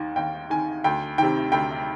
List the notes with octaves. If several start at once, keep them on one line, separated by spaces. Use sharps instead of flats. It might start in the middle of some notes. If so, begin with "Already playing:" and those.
Already playing: D#2 D#3
D#2 G5
D#3 G#5
D2 G5
C3 D#3 G5
D2 G5